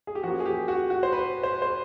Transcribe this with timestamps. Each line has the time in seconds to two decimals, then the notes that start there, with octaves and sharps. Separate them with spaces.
0.07 G#4
0.15 G4
0.23 F3 A#3 C#4 F#4
0.40 G#4
0.46 G4
0.68 F#4
0.90 F#4
1.03 C5
1.12 B4
1.43 C5
1.62 C5